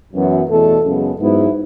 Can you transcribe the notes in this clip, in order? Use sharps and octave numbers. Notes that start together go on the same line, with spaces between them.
F#2 E3 B3
E2 B2 A3 A4
F#2 C#3 G#3 B3
G#2 F#3 B3 E4